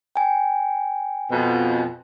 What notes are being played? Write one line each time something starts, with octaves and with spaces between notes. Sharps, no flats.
G5 G#5
F2 B2